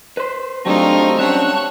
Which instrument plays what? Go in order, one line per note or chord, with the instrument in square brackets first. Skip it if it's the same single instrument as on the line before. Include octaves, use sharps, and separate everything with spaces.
[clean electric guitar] B4 C5
[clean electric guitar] F#3 G3 A3 [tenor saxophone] C4 [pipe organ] D4 C#6 [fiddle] D#4 F4
[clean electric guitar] G3 C#4 D4 [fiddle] C#5 F#5 [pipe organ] A5 C#6 F#6